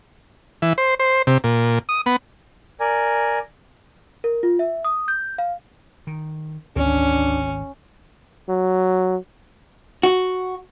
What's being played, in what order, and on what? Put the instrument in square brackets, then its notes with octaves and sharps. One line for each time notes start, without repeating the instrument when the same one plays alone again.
[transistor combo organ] E3
C5
C5
C3
A#2
D#6
B3
[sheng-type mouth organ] A#4 D5 G#5
[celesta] A#4
F4
E5
D#6
G6
F5
[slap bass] D#3
[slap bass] G#1 [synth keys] D2 [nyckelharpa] C#4 [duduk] D4
[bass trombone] F#3
[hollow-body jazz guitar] F#4